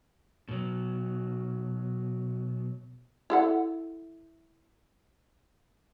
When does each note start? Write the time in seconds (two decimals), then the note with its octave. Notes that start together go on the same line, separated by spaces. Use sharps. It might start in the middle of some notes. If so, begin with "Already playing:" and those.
0.49 B2 F#3
3.30 E4 A4 F#5